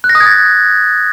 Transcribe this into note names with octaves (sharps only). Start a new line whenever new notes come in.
F#6
A#6
D#6
G#6
A6